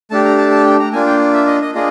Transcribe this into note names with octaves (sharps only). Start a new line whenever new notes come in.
A3 D4 G4 A5
A#5
A5
A5
G5
A#5
A#3 D4 F4 G#5
G5
E5
D#5
D#5
A#3 D4 F4 G#4 D#5